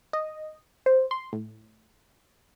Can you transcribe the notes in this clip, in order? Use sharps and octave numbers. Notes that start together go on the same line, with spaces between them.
D#5
C5
C6
A2